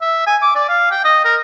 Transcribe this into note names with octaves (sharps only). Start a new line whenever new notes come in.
E5
G#5
D6
D5
F5
G5
D#5
A#4